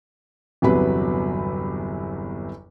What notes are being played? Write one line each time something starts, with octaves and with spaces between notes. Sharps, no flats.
G1 E2 C3 F#3 B4 B5